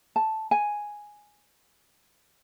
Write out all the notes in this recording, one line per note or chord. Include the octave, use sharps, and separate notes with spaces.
A5
G#5